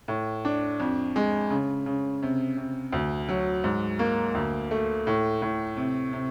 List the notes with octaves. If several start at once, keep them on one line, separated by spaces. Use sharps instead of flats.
A2
D4
F2
G#3
C#3
C#3
C3
C3
D2
F#3
G#2
A#3
D2
A3
A2
A2
C3
C3